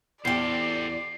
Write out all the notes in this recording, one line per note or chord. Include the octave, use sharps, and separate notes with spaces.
E2 G4 A4 C5 D5 C7